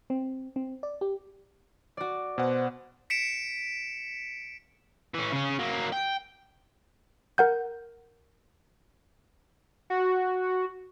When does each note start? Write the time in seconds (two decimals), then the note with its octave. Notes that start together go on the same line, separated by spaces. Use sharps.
0.10 C4
0.56 C4
0.83 D5
1.01 G4
1.97 F#4 D5
2.38 B2 C5 F#5
3.10 B6 C#7 D7 E7
5.14 E3 C#4
5.32 C#3 C#4
5.59 F#3 A#3
5.92 G5
7.38 A#4 F#5 G6
9.90 F#4